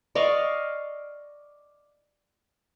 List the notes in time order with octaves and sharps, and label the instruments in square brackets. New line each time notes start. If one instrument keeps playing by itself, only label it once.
[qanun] D5 D#5 F5 C#6